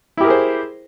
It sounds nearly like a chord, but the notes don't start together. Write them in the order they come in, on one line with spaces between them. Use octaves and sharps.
E4 G4 A#4 G#4 C5